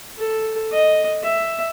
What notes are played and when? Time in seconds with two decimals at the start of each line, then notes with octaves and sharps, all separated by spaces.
0.18 A4
0.72 D#5
1.23 E5